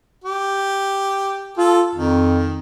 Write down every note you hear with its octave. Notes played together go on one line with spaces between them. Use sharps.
G4
F4 A4
F2 D#3